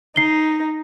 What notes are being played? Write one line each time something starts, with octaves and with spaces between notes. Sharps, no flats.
D#4 C7 G7